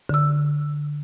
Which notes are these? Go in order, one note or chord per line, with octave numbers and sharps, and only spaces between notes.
D3 E6